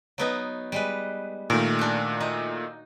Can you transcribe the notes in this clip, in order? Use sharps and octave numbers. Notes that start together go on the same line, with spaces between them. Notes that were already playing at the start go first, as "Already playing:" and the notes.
F#3 B3 D#4
G3 G#3 B4
A#2 D#3 A3 A#4
D4 F#4
D#4